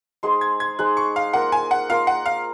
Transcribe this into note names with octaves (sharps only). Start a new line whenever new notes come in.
G#3 D#4 G#4 C5 C6
G#6
G#6
G#3 D#4 G#4 C5 F#6
C#6
F5
A#3 F4 A#4 F#5
G#5
F#5
A#3 F4 A#4 F5
F#5
F5